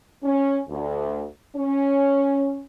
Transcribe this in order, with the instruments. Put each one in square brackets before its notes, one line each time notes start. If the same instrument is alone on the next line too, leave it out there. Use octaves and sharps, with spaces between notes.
[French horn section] C#4
D2
C#4